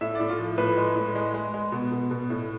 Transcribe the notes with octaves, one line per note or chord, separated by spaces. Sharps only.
A2 E5
A2 D5
F4
F3
A2 B4
G#3
A2
G#3
G#3
G#3
B2
B2
B2
A2